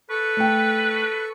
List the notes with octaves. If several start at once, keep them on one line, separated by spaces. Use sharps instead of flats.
A4 B4 C#6
A3 G5